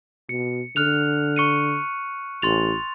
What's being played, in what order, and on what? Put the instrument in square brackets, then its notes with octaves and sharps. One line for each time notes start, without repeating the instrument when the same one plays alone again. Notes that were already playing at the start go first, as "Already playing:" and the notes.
[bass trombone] B2 [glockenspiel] C#7
[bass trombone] D3 [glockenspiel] F6 F#6 F7
[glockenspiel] C#6 C#7 D#7
[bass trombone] A1 [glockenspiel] C6 A6 F7